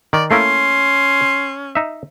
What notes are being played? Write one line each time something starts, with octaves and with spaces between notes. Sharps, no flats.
D#3 D5
A3 A#3 C#4 E4 C6
D#4 E5